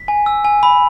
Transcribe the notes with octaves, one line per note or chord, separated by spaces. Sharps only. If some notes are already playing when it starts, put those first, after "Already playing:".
Already playing: B6
G#5
E6
G#5
B5